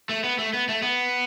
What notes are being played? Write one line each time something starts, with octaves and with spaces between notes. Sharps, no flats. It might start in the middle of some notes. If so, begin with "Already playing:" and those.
A3
B3
A3
B3
A3
B3